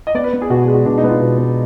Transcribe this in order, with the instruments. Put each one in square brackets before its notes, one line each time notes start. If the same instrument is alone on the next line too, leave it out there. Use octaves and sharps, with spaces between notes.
[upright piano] D#5
[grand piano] B3 [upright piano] D5
[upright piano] B4
[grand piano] B3
[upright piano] G#4
[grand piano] B2 [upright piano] F#4
[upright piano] G#4
[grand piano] G#3
[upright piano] F#4
[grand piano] B2 [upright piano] D4
[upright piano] D#4
[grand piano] B3
[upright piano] F4
[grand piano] B2
B3